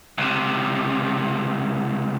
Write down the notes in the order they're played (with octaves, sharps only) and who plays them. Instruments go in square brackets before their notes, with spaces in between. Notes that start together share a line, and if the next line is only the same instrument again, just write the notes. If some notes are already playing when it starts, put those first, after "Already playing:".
[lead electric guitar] C#2 C3